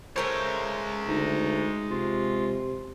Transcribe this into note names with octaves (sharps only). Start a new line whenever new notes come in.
G#3 A3 A#4 C5 C#5
D2 D#4
C3 F4